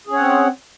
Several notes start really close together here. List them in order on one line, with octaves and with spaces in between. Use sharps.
G#4 C#4 C#5 F#5 C4